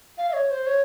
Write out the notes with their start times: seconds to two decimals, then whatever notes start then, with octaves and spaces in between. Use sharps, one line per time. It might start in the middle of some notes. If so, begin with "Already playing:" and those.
0.18 F5
0.29 E5
0.33 C#5
0.51 C5
0.67 C#5